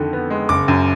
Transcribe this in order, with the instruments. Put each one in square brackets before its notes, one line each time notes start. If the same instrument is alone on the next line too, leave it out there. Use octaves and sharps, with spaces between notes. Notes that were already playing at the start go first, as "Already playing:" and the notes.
Already playing: [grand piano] F2 D3 D#3
B3
G#3
F#1 D6
F#2